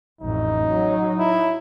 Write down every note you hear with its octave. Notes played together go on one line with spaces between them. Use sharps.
A1 F2 D#4
F#3
E4